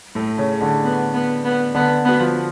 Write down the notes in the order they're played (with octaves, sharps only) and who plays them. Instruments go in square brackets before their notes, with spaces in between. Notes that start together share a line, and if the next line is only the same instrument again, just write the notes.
[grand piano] A2 A3
C#3 C#4
D3 D4
[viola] B3
B3
B3
[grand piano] D3 D4 [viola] B3
[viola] B3 [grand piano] F#4
[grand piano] F3 F4